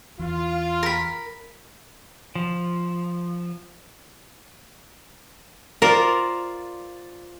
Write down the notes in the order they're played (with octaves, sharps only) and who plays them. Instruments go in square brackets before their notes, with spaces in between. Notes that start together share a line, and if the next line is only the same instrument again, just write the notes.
[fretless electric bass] E2 E3 [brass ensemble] F4
[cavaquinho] A#4 B5
[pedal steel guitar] F3
[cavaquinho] F4 C5 D5 [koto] A#4